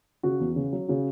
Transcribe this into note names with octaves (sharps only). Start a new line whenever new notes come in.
C#3 F#4
E2
C#3
F#3
C#3 F#4